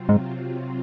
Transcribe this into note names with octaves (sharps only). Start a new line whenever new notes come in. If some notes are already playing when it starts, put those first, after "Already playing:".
Already playing: C3 F#3 C4 F4
G#2